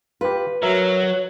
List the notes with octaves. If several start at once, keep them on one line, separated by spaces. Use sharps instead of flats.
F4 G4 B4
F#3 A#4 C#5 E5 A#5